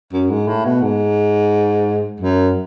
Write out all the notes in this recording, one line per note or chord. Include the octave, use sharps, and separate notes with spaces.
F#2
G#2
A2
B2
G#2
F#2